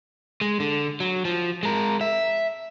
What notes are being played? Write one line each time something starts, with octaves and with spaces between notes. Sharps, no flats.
G#3
D3
F#3
F3
G#3 A#4
E5